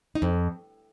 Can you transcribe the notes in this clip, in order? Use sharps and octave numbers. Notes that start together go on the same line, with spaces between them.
D#4
F2